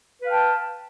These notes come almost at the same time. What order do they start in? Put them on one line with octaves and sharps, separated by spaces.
B4 F5 G5 A5